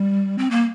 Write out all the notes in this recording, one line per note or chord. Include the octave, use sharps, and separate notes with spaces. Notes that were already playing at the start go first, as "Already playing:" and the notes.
Already playing: G3
C4
A#3